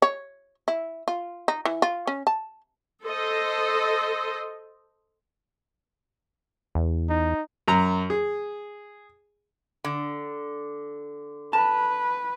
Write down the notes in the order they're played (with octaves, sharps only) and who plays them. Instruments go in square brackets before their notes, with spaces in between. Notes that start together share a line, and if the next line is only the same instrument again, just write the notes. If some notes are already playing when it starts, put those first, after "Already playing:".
[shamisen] C#5
E4
F4
D#4
E3
F4
C#4
A5
[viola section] A4 C5 D#5
[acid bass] E2
[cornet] D#4
[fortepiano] F#2 A#5
G#4
[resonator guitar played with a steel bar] D3
[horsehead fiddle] B4 [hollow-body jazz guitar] A5